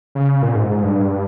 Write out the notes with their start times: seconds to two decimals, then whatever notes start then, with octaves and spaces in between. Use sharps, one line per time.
0.15 C#3
0.42 A#2
0.56 G#2
0.69 G#2
0.83 G2